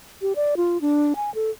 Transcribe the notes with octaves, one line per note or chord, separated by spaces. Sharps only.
G4
D5
F4
D4
G#5
A4